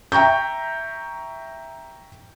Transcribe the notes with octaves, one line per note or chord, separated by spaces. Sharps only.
E5 G5 A#5 C#6 G6